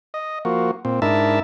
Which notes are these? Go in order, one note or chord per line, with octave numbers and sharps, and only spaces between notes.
D#5
F3 A#3 F#4
A#2 C4
G#2 D4 E4 A#4 E5 A5